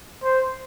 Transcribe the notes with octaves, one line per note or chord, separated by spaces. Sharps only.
C5